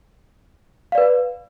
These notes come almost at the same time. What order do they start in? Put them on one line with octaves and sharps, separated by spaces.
F5 D5 B4